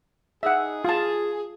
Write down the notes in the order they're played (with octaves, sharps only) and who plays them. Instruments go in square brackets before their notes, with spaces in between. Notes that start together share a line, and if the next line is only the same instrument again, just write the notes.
[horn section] D#4 G#4 [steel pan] E5 F#5
[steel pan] F4 A5 [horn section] G#4